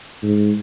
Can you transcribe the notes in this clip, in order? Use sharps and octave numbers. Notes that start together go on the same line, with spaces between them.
G#2